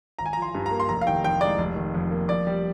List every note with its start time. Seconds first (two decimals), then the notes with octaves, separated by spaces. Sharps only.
0.19 G#1 A#5
0.26 G#5
0.33 A#5
0.37 F3
0.42 C6
0.55 G2
0.66 A#5
0.71 A#3
0.80 C6
0.89 F1 A#5
1.01 F5
1.07 D#3 G5
1.24 F2 G5
1.41 G#3 D5
1.58 F1
1.76 D#3
1.94 F2
2.11 A#3
2.28 F2 D5
2.47 G3